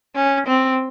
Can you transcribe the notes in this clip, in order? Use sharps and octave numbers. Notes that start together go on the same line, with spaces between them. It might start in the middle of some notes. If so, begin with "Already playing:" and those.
C#4
C4